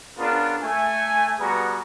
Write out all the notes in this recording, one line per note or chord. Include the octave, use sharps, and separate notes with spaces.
B3 C#4 D4 F4 G#4 A#4
A3 G#5
G3 B3 F#4 G#4 B4 A#5